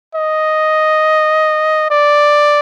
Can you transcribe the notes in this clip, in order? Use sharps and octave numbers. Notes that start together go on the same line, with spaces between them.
D#5
D5